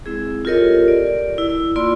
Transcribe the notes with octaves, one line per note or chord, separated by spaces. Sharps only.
G#3 C4 E4 G#4
F4 G4 A4 A#4 C#5 D#5
D5
E4
A#3 F4 D5 B5 C6 E6